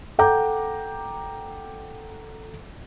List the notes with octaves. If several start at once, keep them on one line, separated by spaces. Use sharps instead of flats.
A4 F#5 G5 A#5 D6 G6